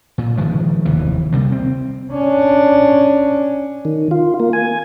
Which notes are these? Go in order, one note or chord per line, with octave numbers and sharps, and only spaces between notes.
A#2
D#3 F3 G#3
F1 D#2 E3
C3 G3 A#3
C4
C#4 D4
D#3
F4
A#3
G#5